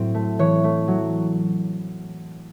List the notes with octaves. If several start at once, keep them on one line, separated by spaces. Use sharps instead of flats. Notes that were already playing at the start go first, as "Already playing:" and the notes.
Already playing: A2 F#3 C4
A3
E3 C#5
A3
F#3